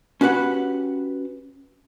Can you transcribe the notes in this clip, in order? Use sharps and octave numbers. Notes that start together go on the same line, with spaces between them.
C#4 F#4 G4 B4 F#5